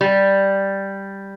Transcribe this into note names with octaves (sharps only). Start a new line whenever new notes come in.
G3